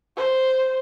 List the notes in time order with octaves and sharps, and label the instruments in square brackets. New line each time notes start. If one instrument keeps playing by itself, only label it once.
[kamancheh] C5